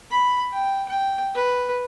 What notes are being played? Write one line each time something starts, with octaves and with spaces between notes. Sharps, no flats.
B5
G5
G5
B4